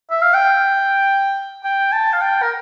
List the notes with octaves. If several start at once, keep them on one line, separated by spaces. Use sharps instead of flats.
E5
F5
G5
G5
A5
F5
G5
A#4